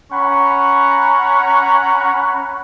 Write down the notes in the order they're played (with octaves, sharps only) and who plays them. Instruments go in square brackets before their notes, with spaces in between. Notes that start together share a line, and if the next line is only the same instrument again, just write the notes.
[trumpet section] C#4 F#5 A#5 B5 C#6